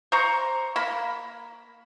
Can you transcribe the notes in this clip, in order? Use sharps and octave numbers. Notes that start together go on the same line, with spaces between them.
C5 A#5 C#6
A#3 B5